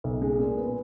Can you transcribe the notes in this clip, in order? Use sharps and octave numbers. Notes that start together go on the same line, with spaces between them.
B1
G#3
A#2
B3